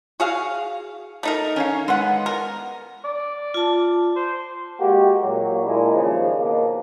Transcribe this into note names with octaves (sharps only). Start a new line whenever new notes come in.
F#4 G#4 F5
A3 D#4 A#4
C#4 C#5 F5
G#3 B3 F#5
A#4
D5
F4 A5
C5
G#3 A#3 F#4 G4
A#2 F#3
A#2 G#3 D4 E4
D#2 C#3 F3
B2 A#3